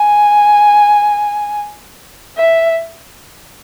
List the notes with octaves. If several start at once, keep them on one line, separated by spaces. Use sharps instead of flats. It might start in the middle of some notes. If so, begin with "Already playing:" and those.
Already playing: G#5
E5